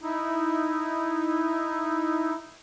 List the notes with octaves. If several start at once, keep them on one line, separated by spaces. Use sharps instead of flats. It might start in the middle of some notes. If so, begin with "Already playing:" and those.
D#4 E4